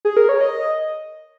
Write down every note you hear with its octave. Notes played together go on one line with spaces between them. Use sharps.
G#4
A#4
C#5
D#5